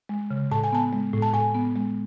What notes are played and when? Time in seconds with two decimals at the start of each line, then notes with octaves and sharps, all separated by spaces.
0.09 G#3
0.31 C#3
0.51 A2 A5
0.64 G#5
0.72 B3 A5
0.93 G#3
1.14 A2
1.22 A5
1.34 A2 G#5
1.55 B3
1.76 G#3